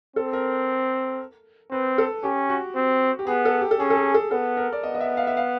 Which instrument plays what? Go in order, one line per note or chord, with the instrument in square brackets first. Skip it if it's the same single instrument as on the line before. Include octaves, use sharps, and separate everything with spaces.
[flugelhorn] C4 [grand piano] A4
[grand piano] A#4
[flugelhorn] C4 [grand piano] B4
[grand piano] A4
[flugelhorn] C#4 [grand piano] G4
[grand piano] F#4
[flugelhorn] C4
[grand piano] G4
[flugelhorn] B3 [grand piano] G#4
[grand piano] A4
G4
A4
[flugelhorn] C#4 [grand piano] G#4
[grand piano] A4
G#4
A4
[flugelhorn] B3 [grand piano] A4
[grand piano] A#4
D5
[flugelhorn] B3 [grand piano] D#5
[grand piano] D#5
E5
F5
E5
F5